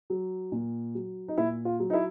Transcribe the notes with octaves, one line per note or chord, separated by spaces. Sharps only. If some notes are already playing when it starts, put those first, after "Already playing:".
F#3
A#2
F#3
D#4
A#2 E4
F4
F#3
D#4
E4